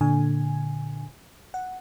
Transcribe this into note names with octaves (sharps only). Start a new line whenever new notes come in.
A#2 D3 G#5
F#5